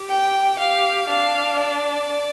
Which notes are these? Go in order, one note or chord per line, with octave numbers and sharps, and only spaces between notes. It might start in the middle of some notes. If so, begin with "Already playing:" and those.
Already playing: G4
G5
G4 F5
D4 F5
D5